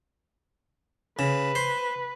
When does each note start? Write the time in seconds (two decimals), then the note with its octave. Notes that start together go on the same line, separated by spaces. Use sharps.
1.19 C#3 B4
1.55 C5